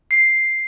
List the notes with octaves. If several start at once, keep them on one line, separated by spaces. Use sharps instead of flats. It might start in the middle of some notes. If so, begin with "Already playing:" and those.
C7